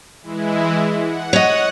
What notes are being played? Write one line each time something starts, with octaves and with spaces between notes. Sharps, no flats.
E3 G#3 E4
F#5
C#5 D#5